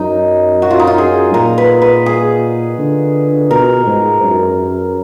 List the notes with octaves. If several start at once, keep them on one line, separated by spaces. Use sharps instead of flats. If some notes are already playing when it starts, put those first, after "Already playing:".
Already playing: F#2 D#4
F#4
F4
D#4
F4
G#4
A#2 A#4
B4
B4
G#4
D3
B2 A#4
G#2
F#2